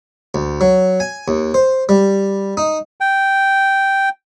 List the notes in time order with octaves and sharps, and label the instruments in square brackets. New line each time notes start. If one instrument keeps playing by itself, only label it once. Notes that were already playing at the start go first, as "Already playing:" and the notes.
[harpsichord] D2
F#3
G#5
D#2
C5
G3
D#4
[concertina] G5